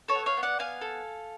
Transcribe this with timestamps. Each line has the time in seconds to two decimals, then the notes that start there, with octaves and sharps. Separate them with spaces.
0.08 A4 C#5
0.15 B3
0.26 C#5 F5
0.37 B3
0.43 D5 F#5
0.59 B3 F5 G#5
0.81 A4